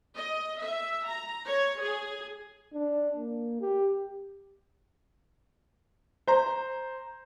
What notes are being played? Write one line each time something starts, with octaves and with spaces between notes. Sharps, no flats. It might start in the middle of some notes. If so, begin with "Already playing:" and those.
D#5
E5
A#5
C#5
G#4
D4
A#3
G4
C5 A#5